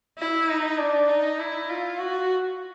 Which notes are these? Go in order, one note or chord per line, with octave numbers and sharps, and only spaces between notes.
E4
D#4
D4
D#4
E4
F4
F#4